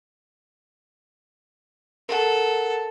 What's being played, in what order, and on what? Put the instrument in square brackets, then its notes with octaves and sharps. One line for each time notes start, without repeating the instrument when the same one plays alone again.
[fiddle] A4 [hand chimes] A#4 F#5